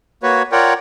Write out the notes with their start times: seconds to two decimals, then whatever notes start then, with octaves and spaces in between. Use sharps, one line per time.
0.23 A#3 F#4 B4 C#5
0.52 F4 A#4 C#5 D5 F#5 G5